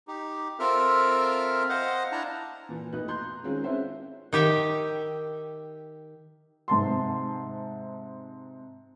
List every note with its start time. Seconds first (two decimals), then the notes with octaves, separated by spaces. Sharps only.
0.08 D#4 G4
0.60 C4 F4 A4 A#4 E5 F6
1.69 C5 D#5 F5 F#5
2.12 D4 E4 A5 A#5
2.69 A#2 E3
2.93 B1 A3 D#4 B4 F#6
3.08 A#5 C6 F#6 G6
3.44 D#3 G#3 C4 C#4 F4
3.64 G#3 C#4 D4 E4 C5 E5
4.33 D#3 G4 E5 G5
6.68 G#2 C3 A5 C6